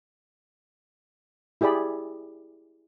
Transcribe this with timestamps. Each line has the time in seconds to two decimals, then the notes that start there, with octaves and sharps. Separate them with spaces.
1.61 E4 G4 G#4 D5 B5